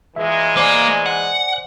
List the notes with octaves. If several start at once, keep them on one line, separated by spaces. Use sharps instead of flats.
A#2 E3 G#3 E5
A#3 C5 D5 G#5
F#5